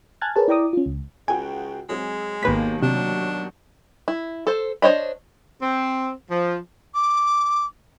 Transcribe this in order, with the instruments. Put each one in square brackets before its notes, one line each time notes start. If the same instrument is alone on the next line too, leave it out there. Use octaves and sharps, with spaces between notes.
[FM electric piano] G#5 A5 F6 F#6 G#6 A6
G#4 A#4 B4 C#5 A5
E4 D5 G5 A#5 D6 D#6
C#4 F4
C#2
[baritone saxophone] C#2 [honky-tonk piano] F#4 G#4 G5 [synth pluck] G#5
[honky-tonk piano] F#3 C4 G#4 [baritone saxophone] G#3
[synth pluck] G#1 B4 B6 [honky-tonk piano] D#2 B2 D#3 [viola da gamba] A#3
[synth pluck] C3 [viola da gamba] F#3 [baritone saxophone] D4
[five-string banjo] E4
A4 C5
D4 C5 C#5 D#5 B5
[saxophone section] C4
F3
[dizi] D6